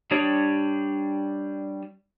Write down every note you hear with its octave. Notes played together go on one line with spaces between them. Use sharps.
G3 D4 G4 C#5 D#6